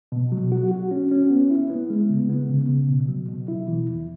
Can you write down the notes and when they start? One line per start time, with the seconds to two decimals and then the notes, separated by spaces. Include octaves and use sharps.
0.12 B2
0.32 F#3
0.52 F#4
0.71 F#4
0.91 C#4
1.11 C#4
1.31 B3
1.50 E4
1.70 B3
1.90 G#3
2.10 C#3
2.30 B3
2.49 C#3
2.69 C#3
2.89 B2
3.08 F#3
3.29 B2
3.48 E4
3.68 E3
3.88 E2